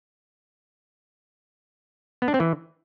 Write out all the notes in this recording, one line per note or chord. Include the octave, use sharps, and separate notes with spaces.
B3
D4
C4
E3